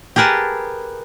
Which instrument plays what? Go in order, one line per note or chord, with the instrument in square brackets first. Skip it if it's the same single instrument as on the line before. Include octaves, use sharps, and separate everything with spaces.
[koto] G4 G#4 A#4 B4 A5